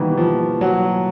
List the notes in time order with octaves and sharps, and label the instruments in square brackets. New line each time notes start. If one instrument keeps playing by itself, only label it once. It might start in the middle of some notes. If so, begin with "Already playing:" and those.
Already playing: [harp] B2 G3 A#3 [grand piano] D#3 E3
[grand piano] F3
F#3